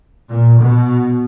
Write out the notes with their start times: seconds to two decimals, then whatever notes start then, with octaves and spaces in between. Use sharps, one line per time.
0.29 A#2
0.61 B2